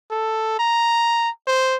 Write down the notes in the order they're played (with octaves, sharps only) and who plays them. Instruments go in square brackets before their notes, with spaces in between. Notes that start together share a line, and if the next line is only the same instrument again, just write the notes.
[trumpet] A4
A#5
C5